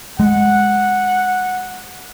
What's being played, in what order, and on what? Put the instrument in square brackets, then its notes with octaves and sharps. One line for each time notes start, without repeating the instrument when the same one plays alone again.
[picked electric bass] G#3 [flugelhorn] F#5